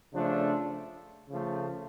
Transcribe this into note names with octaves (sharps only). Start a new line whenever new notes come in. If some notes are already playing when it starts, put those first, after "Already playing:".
C#3 F3 A3 D4
C#3 F3 A3